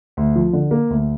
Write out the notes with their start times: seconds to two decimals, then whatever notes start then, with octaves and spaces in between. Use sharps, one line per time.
0.17 D2
0.36 F3
0.53 D3
0.71 A#3
0.90 D2